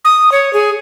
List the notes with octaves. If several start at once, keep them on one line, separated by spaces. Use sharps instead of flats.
D#6
C#5
G#4